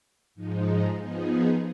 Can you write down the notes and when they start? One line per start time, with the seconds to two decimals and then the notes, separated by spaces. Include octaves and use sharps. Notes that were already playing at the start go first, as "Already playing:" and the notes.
0.35 G#2 F3 G#3 D#4
0.98 F3 B3 D#4 G#4